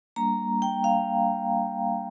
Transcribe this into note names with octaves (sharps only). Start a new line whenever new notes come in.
G3 A#3 D4 A#5
G5
F5